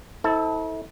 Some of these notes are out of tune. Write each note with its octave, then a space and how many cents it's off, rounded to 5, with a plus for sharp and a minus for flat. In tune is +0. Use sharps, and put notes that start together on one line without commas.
E4 -40 A4 +0 C5 +0